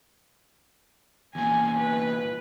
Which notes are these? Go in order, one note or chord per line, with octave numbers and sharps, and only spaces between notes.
E2 A#2 G#5
B4